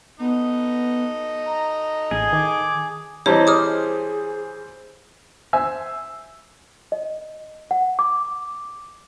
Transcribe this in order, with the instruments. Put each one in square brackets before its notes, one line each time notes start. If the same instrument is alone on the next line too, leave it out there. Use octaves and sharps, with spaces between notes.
[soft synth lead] B3 [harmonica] D#4 A4 D#5
[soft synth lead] A#5
[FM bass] A1 [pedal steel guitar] G#4
[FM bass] D#3 [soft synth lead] D6
[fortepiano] E3 G3 C4 [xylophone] C#5 [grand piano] D#5 A5 A#5
[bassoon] G#4 [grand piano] C5 [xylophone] D6 D#6 F6
[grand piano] C5 E5 G#5 E6
[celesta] D#5
F#5
D6